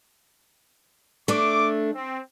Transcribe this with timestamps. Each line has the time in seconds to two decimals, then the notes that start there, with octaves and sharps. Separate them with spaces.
1.28 A3 D4 D6
1.93 C4